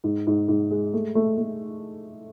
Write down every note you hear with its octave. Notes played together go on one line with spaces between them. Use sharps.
G#2
G#2
G#2
G#3
A3
A3
A3